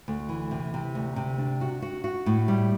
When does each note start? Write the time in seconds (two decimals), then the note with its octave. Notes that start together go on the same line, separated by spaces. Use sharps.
0.08 D2
0.29 E3
0.51 C3
0.74 C3
0.95 D2
1.16 C3
1.38 D4
1.61 F#4
1.82 F#4
2.04 F#4
2.26 A2
2.48 G3